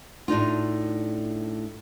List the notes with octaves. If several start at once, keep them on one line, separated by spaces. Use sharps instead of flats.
A2 D4 D#4 F4